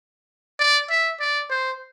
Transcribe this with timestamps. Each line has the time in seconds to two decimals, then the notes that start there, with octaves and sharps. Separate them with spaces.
0.59 D5
0.90 E5
1.20 D5
1.50 C5